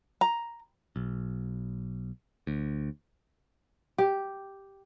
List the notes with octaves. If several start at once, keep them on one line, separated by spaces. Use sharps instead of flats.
A#5
B1
D2
G4